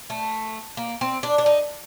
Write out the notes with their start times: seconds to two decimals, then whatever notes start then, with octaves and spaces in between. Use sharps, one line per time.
0.10 A3
0.77 A#3
1.01 C4
1.23 D4
1.38 D4
1.46 D#4